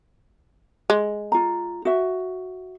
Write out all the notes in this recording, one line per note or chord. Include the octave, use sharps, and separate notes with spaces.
G#3
F4 A#5
F#4 E5